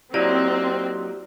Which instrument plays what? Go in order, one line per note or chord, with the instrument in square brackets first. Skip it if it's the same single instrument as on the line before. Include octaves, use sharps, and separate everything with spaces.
[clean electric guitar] F#3 A#3 D#4 [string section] C4 [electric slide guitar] E4 G4 [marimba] D5